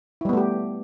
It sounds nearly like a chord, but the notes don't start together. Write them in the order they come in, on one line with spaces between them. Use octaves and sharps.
E4 G3 B3 A3 G4